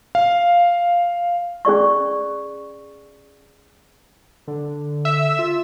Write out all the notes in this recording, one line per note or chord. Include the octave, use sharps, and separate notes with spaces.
F5
C#4 G#4 D5 C#6
D3
E5
F4